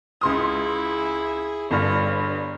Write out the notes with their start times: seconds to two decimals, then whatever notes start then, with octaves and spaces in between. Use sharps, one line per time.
0.21 C#2 E4 G#4 C6 D#6
1.71 G1 G2 C#5